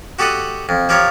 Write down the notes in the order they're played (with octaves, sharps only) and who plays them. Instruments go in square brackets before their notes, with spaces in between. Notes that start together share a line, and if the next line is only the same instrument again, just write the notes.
[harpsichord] F#4 G4 A4 D#5 F#5
F2
F3 G4 A#4 C#5